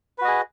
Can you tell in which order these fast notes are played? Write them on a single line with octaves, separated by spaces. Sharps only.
B4 F#4 D#5 G#4